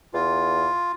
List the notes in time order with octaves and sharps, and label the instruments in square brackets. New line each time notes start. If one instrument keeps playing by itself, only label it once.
[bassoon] E2 [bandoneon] F4